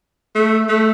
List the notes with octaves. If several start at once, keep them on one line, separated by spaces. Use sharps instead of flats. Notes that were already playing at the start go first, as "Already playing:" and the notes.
A3
A3